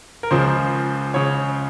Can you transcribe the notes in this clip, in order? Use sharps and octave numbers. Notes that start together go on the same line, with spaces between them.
A#4
C#2 C#3 F3 C5
C#3 C#5